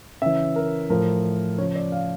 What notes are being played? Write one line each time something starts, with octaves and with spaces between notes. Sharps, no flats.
C#3 E3 E5
A#4
A2 F3 A#4
C#3 F3 C#5
D5
F5